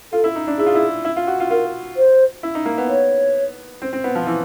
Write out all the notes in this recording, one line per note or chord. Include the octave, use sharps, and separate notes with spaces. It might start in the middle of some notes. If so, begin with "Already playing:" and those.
F4 A4
E4
D#4
D4
E4 G#4
F4
E4
E4
F4
F#4
F4
F4 A#4
C5
E4
D#4
A#3
B3
C#5
C4
C4
B3
F3
E3